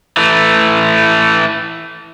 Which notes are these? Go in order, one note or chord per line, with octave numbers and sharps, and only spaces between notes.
E3 A3